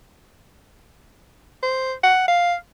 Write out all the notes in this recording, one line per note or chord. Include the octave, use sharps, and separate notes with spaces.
C5
F#5
F5